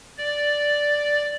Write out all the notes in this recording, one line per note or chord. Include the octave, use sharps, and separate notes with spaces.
D5